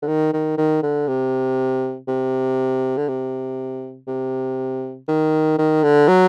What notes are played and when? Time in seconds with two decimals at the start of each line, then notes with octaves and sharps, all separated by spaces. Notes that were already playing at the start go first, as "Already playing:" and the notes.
0.03 D3
0.08 D#3
0.33 D#3
0.57 D#3
0.83 D3
1.08 C3
2.08 C3
2.97 D3
3.08 C3
4.08 C3
5.08 D#3
5.58 D#3
5.83 D3
6.08 F#3